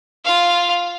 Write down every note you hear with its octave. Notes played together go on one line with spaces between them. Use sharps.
F4 F5